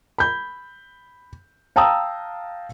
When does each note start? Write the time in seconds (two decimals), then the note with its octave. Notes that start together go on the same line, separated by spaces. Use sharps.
0.18 B5 G6
1.76 F5 G5 A5 A#5 D#6 E6